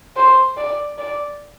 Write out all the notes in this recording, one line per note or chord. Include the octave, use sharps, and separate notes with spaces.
C5
D5
D5